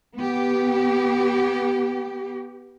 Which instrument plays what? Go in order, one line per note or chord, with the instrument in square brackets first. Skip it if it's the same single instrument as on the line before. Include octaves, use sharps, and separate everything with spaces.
[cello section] B3 G4